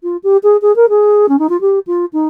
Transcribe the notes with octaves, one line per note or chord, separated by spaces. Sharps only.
F4
G4
G#4
G#4
A#4
G#4
C#4
D#4
F4
G4
F4
D#4